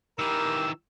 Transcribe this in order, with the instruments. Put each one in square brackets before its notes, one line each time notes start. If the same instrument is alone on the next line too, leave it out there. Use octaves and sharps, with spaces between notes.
[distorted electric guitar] D#3 E3 [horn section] G4 A#4 [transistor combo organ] E6